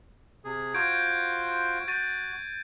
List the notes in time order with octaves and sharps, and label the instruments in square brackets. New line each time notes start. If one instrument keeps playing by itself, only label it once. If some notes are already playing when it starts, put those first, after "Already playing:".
[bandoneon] C3 G#4
[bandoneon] F4 F#4 C5 [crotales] G6 G#6 D7
[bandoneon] F#4 [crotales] G6 A6 D#7